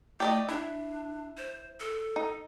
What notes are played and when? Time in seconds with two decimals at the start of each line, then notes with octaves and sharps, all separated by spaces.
0.20 A3 G4 D5 D#5
0.49 D4 E4
1.37 C5
1.80 A4
2.16 D#4